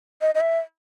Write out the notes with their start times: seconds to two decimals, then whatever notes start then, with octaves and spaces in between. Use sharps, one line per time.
0.21 D#5
0.35 D#5
0.41 E5